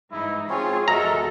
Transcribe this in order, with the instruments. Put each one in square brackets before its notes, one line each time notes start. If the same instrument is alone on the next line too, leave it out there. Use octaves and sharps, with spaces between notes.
[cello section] G#2 E3 D#4 [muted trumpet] E4
[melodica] C4 C#5 [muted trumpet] C#4 [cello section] F4 G#4
[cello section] E2 F#4 A4 [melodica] G#3 A#4 [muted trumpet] E5 [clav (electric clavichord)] A#5